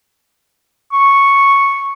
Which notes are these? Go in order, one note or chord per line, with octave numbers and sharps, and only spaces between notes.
C#6